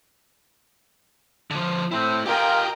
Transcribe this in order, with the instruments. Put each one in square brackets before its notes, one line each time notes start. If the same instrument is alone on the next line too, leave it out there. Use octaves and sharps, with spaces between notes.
[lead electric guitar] D3 F3
[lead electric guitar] A3 E4 [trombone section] C4
[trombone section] F4 [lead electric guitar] G4 G#5 [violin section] A#4 D#5 G5